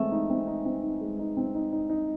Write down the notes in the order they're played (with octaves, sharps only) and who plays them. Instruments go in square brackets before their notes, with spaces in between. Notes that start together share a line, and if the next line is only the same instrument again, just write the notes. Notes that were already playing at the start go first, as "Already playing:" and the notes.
Already playing: [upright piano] E3 G#3 C4 [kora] A3
[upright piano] D#4
C4
D#4
C4
D#4
G#3
D#4
C4
D#4
D#4
D#4